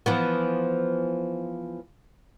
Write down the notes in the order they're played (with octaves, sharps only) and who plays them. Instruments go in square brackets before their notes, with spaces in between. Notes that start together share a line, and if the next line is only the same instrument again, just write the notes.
[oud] E3 F3 B3